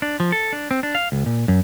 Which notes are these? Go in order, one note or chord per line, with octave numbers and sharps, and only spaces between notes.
D4
F3
A4
D4
C4
D4
F5
C#2
A#2
F#2